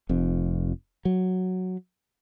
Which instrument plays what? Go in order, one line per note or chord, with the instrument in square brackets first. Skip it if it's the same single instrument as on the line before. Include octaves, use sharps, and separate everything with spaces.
[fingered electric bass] F1 F2
F#3